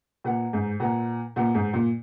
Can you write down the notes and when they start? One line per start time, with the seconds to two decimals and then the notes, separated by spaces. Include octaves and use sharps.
0.24 A#2 B4 F#5 A#5
0.53 G#2
0.80 A#2 B4 F#5 A#5
1.36 A#2 B4 F#5 A#5
1.55 G#2
1.73 A#2